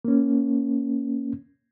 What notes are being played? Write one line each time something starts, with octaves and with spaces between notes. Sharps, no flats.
A#3 C#4